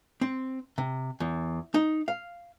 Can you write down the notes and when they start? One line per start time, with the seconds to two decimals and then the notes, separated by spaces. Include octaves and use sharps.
0.21 C4
0.78 C3
1.20 E2
1.74 D#4
2.08 F5